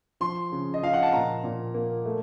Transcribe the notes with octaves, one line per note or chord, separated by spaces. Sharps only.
F3 C6
C#3
D#5
F3 F5
F#5
A5
A#2 A#5
A#2
A#3
A3